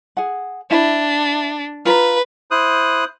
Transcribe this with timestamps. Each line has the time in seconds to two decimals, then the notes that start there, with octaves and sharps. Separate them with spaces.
0.17 G#4 F#5
0.71 D4 E4 E5 B5
1.85 F4 B4 A#5
2.51 E4 C5 D#6 F#6